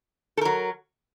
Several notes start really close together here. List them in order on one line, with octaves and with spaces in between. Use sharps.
A4 A#4 F#3